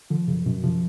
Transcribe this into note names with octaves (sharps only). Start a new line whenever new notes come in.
D3 F3
F#2 C#3
F#2 B2
C3 F3